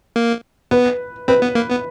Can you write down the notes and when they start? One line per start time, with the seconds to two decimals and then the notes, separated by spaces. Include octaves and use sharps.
0.16 A#3
0.71 B3 B4
1.28 C4 B4
1.42 B3
1.55 A#3
1.70 B3